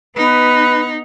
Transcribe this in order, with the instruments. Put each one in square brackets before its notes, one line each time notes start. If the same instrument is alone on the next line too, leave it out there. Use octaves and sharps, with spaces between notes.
[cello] B3 D#4 [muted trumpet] B4